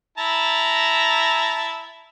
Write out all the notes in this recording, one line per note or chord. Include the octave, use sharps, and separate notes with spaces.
E4 A5 A#5